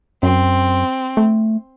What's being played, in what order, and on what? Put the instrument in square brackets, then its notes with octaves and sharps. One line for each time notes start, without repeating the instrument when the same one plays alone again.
[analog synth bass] F#2 [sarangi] C4
[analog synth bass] A3